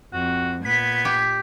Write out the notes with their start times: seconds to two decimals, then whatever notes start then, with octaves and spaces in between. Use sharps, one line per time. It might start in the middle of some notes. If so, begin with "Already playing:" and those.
0.13 F2 F#4
0.65 A#2 B3 G#6 B6
1.05 G4